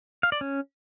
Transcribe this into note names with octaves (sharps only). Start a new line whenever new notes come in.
F5
D5
C#4